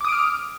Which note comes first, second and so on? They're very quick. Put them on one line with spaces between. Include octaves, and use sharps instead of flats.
D6 D#6 D7 F6